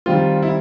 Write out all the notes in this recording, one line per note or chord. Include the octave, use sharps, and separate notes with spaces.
D#3 G3 C4 F4
E4